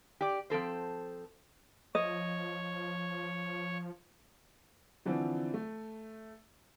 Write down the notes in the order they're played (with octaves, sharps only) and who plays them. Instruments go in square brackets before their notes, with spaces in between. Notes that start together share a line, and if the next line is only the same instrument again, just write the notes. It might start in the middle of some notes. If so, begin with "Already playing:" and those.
[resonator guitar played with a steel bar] G4 D5
F3 C4 A4 C5
[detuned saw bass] F3 [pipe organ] C#5 [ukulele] D#5
[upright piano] D3 E3 F3 C4
A3